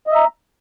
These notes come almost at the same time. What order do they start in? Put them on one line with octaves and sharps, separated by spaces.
D#5 E5 A#5